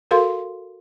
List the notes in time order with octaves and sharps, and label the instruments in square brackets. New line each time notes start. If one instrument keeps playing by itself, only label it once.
[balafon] F#4 A4 A#4 F5 C6